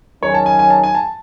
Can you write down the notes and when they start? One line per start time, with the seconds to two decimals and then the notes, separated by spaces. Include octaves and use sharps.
0.22 D#3 F#3 C#4 G#4 C#5
0.34 A5
0.46 G#5
0.59 G#5
0.70 A5
0.83 G#5
0.95 A5